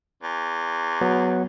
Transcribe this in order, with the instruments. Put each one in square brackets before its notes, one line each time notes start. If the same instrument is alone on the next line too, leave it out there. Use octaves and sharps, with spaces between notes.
[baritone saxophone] E2
[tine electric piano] F#3 B3